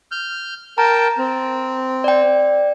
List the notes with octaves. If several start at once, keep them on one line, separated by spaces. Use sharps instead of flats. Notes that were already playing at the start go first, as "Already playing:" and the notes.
F6 G6
A#4 G5 A5 A#5
C4
D5 G5